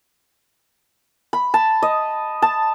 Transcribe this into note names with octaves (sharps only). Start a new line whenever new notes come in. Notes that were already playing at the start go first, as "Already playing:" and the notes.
B5
A5
D#5
A5